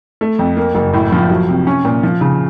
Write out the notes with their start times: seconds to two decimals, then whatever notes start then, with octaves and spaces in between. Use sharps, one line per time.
0.21 A3
0.39 F2
0.57 A#3
0.75 F#1
0.93 A2
1.12 F3
1.30 F#3
1.49 C3
1.67 C#4
1.85 A#2
2.03 F3
2.21 C#3